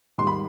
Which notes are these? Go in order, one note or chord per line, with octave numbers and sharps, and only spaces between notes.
G#2 D#3 G3 C6
B5